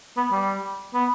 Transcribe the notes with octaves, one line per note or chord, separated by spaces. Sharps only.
B3
G3
B3